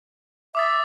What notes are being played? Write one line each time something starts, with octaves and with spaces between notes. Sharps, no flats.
E5 D6 D#6 A6